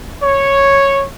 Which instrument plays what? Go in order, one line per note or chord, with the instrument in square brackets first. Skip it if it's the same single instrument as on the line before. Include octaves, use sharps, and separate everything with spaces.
[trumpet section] C#5